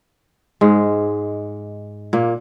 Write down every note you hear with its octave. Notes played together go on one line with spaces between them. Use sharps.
G#2 G#3
A#2 A#3